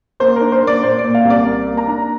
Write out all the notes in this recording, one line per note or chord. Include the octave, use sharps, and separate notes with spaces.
A#3 C5
D4 A#4
C5
A#3 D5
A#2 C5
D5
A#2
F5
C2
D5
A#3
A#3
A#5
D4